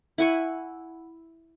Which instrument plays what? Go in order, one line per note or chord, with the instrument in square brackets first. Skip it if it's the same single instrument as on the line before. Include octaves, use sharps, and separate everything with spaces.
[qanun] E4 F#5 G#5 C#6